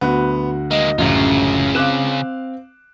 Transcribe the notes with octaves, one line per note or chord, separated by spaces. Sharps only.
D2 B3 F#4 F#6
G#3 A#3 D#5
A1 F#2 C#3 F4
C4 F5 D6 F#6 E7